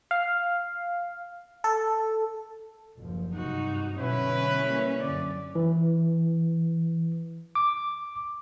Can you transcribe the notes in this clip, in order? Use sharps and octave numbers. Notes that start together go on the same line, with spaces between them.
F5
A4
F#1 D#2 F3
G2 C3 D#4 F#4
B2 D3 F#3 C#4 E4 B4
G3 A#3
F#2 D3 D5
E3
D6